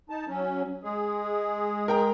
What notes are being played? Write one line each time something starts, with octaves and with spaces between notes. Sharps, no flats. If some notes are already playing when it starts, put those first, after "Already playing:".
D#4 A5
F#3 C#4
G#3 G#4
A#4 G5 A#5